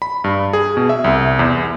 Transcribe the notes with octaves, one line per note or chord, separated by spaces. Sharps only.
B5
G2
G#4
B2
E5
C2
E2